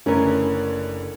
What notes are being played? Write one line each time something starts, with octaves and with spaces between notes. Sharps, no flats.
F#1 D3 A3 C#4 E4 G#4 A#4 B4